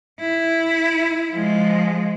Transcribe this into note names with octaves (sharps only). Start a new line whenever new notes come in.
E4
F3 G#3